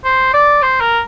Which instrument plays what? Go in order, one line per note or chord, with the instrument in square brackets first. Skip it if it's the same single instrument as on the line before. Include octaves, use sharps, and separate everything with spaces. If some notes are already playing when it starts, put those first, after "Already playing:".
[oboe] C5
D5
C5
A#4